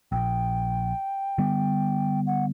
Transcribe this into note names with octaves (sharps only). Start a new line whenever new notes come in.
A#1 G5
D3 G3 B3
F#5